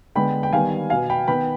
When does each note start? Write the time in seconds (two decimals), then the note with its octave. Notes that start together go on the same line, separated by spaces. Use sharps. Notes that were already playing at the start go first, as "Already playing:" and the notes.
0.15 D3 G#3 B3 G5 B5
0.43 G5
0.53 D#3 G3 B3 F5 G#5
0.90 B2 B3 F5 G#5
1.10 G5 B5
1.28 D#3 B3 G5 B5